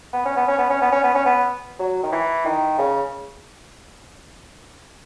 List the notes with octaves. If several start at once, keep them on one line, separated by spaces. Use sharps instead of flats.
B3
C#4
B3
C#4
B3
C#4
B3
C#4
B3
C#4
B3
F#3
D#3
E3
D#3
C#3